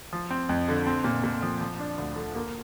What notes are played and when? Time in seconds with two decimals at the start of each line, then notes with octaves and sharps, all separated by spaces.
0.13 F3
0.31 C4
0.49 F2
0.68 D3
0.87 C4
1.04 A#2
1.24 A#2
1.42 F3
1.61 F3
1.79 D4
1.98 D2
2.16 D3
2.35 A#3